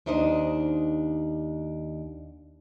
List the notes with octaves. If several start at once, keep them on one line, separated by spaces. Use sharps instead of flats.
D#2 D4 D#4 C5 D#5